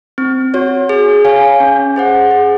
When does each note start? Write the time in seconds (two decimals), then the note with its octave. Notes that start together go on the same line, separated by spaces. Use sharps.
0.18 C4
0.54 F#4 C#5
0.89 G#4
1.25 C#5 F5 G#5
1.60 C#4
1.96 G#4 C5 F#5
2.31 G#4